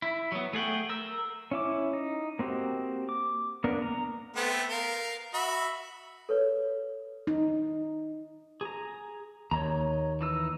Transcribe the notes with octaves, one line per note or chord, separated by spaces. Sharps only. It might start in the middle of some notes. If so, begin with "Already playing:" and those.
E4
F#3 B3
A3 G#4 F#5 G5
A#4 E6
C#4 E4 D6
D#4
A#3 C4 F#4 G4
D6
A#3 B3 D4 A#4
A#5
A3 B3 C4
A#4 F5
F#4 E5 B5
A4 B4 C#5
D#4
G#4 A#5
D#2 C#5 D#5 A#5
E3 D#4 E6